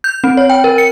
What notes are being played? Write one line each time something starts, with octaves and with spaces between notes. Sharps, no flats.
G6
C4
C#5
G5
A#4
C#7